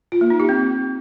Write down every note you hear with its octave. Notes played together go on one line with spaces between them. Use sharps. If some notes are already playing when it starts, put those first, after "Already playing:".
F4
A#3
D#4
G4
C4